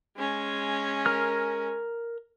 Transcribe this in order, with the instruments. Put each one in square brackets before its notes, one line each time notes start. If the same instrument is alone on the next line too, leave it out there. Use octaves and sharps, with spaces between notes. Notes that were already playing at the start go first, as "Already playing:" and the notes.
[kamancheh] G#3 C#4
[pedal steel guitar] A#4 F6